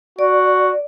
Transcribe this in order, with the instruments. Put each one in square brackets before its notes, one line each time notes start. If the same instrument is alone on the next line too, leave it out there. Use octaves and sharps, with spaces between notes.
[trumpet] F#4 [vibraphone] D5